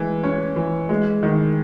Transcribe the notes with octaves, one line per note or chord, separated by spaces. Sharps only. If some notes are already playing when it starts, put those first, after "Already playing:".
Already playing: E3 G#3
C#4
E3
G#3
D#3